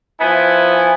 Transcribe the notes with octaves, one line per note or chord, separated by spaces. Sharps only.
F3 B3 E4 G#5